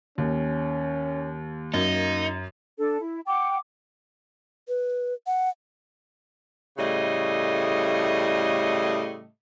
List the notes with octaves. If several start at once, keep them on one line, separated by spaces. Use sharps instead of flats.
D#2 C#4
F#2 A#3 D#4
D4 A4
E4
F#5 G5 D6
B4
F#5
A2 C#3 G3 A3 D#5